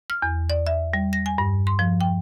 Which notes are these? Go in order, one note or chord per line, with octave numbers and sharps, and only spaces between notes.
F6
E2
D5
E5
G3
A#6
G#5
G2
C6
F3
G5